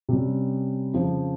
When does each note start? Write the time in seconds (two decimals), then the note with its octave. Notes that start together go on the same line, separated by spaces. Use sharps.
0.09 C3 G3 C#4
0.94 F2 C#3 F3